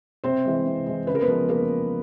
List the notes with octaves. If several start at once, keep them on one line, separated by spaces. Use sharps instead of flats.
C3 C4 C5
E3 G#3
C3
E3 G#3
C#3 B4
A#4
B3 B4
F3 G#3
C#3 A#3 A#4